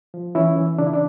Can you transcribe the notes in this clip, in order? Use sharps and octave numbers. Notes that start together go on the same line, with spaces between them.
F3
E3 C#4 E4
E3
C#3 D4
E4
D4